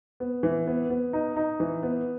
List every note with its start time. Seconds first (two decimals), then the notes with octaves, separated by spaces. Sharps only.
0.20 B3
0.43 E3
0.67 B3
0.90 B3
1.13 D#4
1.36 D#4
1.60 E3
1.83 B3